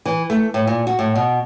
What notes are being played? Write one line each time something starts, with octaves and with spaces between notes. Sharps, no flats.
E3
A3
A2
A#2
F#4
A2
B2